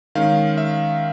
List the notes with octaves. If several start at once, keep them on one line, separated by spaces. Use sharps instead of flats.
D#3 G#3 C#4 F5
E5